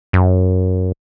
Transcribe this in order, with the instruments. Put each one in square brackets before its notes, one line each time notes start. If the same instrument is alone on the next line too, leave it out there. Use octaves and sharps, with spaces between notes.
[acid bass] F#2